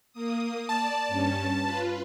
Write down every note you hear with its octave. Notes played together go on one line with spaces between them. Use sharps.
A#3 D#6
D5 A5
G2 C#4
F4 B4